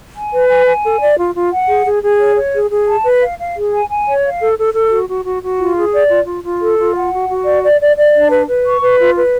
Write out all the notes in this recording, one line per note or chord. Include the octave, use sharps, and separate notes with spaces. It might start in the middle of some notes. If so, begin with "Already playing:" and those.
G#5
B4
G#5
G#5
A4
D5
F4
F4
F#5
G#4
G#4
G#4
C#5
C#5
G#4
G#4
A5
B4
F5
F5
G#4
G#5
G#5
C#5
F5
A4
A4
A4
F#4
F#4
F#4
F#4
F4
G#4
D5
F4
F4
F4
A4
F4
F#5
F#4
F#4
D5
D5
D5
D5
D4
B4
B4
C#6
B4
F4
B4